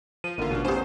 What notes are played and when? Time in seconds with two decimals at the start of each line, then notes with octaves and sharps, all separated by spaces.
0.24 F3 D#7
0.38 A1 D3 A#3 F4
0.51 B2 D4
0.65 A1 E2 G4 C5 G#5